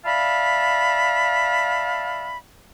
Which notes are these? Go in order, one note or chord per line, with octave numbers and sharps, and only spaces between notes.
D5 E5 F5 A5 B5